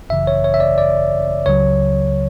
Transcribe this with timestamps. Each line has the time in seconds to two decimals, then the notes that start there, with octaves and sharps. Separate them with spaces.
0.09 G#1 F#2 C#3 E3 E5
0.27 C#5
0.44 C#5
0.54 E5
0.60 D5
0.78 D5
1.46 C#2 C#3 F#3 C#5